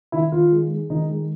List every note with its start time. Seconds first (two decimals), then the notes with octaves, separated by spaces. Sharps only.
0.12 D#3 E4
0.32 D#3 F4
0.51 G#3
0.70 G#3
0.90 D#3 D#4
1.10 G#3